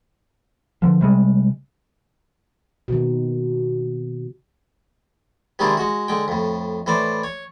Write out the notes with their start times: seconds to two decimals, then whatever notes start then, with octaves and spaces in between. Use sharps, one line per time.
0.82 D3 F3
1.01 C3 G3 G#3
2.88 B2 D#3
5.59 C3 D#3 G#3 D4 E4 F4
5.77 G#3 F#4
6.08 D3 G#3 G5
6.28 F2 A2
6.86 A2 E3 C5 D5
7.24 C#5